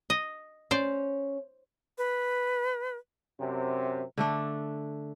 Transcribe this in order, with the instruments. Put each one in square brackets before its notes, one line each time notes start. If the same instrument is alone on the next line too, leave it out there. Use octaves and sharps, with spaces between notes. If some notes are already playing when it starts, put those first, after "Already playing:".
[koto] D#5
[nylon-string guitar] C#4 [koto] C5 D5
[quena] B4
[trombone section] F#2 C3
[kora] D3 A3 D4